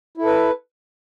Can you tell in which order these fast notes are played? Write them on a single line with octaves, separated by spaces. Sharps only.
E4 A4 B4